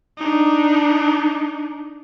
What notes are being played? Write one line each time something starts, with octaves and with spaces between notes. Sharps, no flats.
D4 D#4